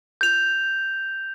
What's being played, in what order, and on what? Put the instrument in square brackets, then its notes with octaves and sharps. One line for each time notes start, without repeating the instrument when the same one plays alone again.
[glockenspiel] G6 F7